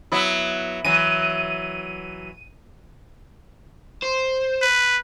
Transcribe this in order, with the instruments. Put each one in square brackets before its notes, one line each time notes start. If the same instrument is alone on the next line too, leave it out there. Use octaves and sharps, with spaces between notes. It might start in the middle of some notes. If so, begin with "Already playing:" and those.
[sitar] F#3 B3 E4
[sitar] E3 F#3 [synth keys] D#7
[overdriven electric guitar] C5
[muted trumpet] B4